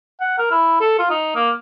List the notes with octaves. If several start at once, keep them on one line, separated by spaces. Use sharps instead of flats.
F#5
A#4
E4
A4
F4
D#4
A#3